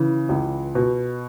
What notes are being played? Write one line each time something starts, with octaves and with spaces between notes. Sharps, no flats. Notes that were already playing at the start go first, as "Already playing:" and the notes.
Already playing: C#3 E3
C#2
B2